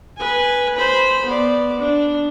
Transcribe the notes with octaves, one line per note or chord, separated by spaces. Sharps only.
B4 G#5
C5 B5
B3 D5
D4